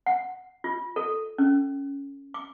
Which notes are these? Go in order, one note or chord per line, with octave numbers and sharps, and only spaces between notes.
F#5
F4
A4
C#4
D6